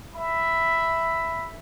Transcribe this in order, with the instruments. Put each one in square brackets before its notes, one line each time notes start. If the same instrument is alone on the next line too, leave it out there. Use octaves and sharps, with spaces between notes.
[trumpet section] E5 B5